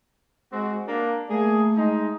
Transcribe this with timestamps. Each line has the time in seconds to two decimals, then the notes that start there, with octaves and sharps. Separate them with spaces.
0.52 G#3 C4 F#4
0.88 A#3 D4
1.30 A3 A#3 G#4
1.76 G#3 D#4